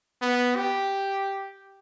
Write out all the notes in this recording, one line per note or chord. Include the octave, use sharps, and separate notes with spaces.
B3
G4